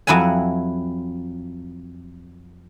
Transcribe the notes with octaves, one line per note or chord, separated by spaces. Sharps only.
F2 F#3 E4 F#5 G#5